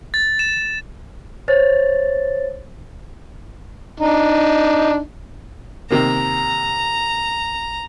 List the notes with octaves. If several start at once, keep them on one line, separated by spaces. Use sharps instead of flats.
A6
E7
C5 C#5 A6
D4 D#4
C3 D#3 A#3 A#5